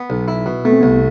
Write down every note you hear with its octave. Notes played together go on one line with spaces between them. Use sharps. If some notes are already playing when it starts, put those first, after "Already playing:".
Already playing: B3
B1
E4
B2
A3 B3
C4
C2 B3